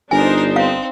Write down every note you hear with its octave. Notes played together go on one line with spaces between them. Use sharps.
G1 D4 D#4 A#4 C5 G#5
C4 F5